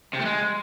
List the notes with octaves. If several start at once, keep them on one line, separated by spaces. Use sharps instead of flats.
C3
A3
G#3